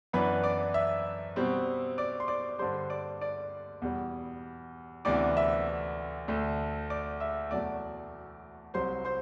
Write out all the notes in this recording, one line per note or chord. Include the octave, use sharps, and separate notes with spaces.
F#2 E3 B3 D4 B4 B5
D5 D6
E5 E6
B2 G3 C4
D5 D6
C6
D5 D6
G2 D3 G3 C5 C6
D5 D6
D5 D6
E2 B2 G3
D2 C3 E3 B3 D4 D5 D6
E5 E6
D2 D3 A3
D5 D6
E5 E6
E2 B2 F#3 A3 D5 D6
C2 C3 F#3 C5 C6
C5 C6